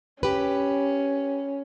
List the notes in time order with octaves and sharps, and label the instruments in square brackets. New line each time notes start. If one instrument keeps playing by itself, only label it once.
[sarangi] C#4 [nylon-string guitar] G4 B4